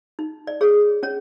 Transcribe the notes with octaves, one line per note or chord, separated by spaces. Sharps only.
D#4
D5
G#4 C#5
C#4 C#5